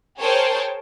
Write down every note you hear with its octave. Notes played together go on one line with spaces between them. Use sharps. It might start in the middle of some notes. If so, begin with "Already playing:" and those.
G#4 A#4 C5 C#5 G5 A5